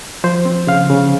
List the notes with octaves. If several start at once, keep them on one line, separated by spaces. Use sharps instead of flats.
F3 C5
C4
C#3 F5
C#3